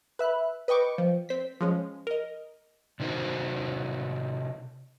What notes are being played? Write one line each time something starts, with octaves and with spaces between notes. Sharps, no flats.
B4 E5 F#6
B4 D#5 G5 C#6 D6
F3
C4 B6
F3 G#3 C#4
A#4 D#5
C3 D#3 D#4 F#4 C5